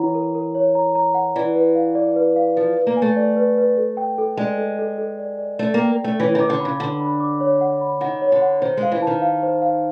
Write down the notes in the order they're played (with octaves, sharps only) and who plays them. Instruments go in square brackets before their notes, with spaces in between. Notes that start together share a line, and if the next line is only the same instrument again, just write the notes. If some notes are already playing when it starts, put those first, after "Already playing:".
Already playing: [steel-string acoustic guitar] E3 [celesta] C#5 F#5 A#5
[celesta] A#4
A#4
C#5
A#5
A#5
F#5
[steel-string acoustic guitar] E3 [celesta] D5
[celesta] B4
F5
D5
B4
F5
[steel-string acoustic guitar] F3 [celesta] B4
[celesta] B4
[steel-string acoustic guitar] A#3
[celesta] G#5
[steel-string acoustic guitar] A3
[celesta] D5
B4
B4
A4
G5
A4
[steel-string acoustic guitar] G#3 [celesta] D5
[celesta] A4
A4
A4
D5
D5
[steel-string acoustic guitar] A3 [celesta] D5
[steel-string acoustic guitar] A#3 [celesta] G5
[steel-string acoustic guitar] A3 [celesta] G5
[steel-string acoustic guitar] E3 [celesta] C#5
[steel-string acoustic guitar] D#3
[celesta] D6
[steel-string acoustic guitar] D3
[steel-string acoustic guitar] C#3 [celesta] B5
[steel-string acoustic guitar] D3 [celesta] B5
[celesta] B5
D6
C#5
F#5
B5
[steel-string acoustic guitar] D#3 [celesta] F#5
[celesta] C#5
[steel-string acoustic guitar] D3
[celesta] F#5
[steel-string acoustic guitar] D#3 [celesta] C5
[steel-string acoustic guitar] G#3
[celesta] F5
[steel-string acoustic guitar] E3
[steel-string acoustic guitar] D#3 [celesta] A5
[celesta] F5
C5
F5